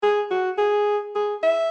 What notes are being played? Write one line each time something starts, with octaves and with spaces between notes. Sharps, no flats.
G#4
F#4
G#4
G#4
E5